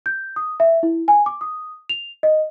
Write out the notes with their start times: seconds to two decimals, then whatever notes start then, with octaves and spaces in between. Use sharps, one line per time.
0.06 G6
0.36 D#6
0.60 E5
0.83 E4
1.08 G#5
1.26 D6
1.41 D#6
1.89 F7
2.23 D#5